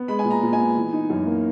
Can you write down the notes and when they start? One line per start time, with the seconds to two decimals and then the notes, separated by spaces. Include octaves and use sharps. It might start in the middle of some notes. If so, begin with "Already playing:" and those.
Already playing: B3
0.08 G#3 B5
0.19 G#5
0.24 A#2
0.31 A#5
0.42 A#2
0.53 G#5
0.59 B3
0.76 E3
0.93 D#4
1.10 F#2
1.26 A#3